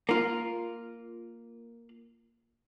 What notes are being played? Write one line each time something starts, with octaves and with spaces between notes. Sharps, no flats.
A#3 F4